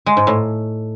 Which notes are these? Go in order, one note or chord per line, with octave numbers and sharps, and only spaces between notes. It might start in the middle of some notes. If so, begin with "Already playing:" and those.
G#3
G#2
A2